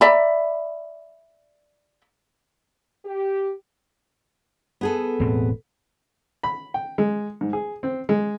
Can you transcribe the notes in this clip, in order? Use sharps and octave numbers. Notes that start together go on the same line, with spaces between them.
D5 E5 A#5 B5
G4
B3 G#4 A4
E1 A2 C4
B5
G5
G#3
G#2
G#4
C4
G#3